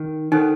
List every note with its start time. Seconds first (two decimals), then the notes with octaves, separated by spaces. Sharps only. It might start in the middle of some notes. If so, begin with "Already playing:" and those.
Already playing: D#3
0.32 D#3 D#4 A4 C5 F#5